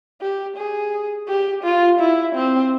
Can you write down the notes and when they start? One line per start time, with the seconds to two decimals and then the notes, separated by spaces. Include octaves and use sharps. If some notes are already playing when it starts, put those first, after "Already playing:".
0.21 G4
0.57 G#4
1.29 G4
1.63 F4
2.00 E4
2.35 C4